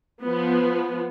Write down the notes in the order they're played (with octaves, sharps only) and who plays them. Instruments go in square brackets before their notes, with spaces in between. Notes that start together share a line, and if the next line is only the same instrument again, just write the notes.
[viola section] F3 B3